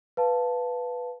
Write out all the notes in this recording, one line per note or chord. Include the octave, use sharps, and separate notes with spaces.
B4 F5 A5